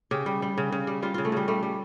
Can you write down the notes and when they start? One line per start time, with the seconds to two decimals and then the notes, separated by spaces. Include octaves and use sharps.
0.11 C#3 G4
0.26 G3
0.42 G3
0.58 C#3
0.72 C#3
0.87 G3
1.02 G3 F4
1.14 C#3 F4
1.25 A3
1.32 C#3 G3
1.48 G3 A3
1.63 G3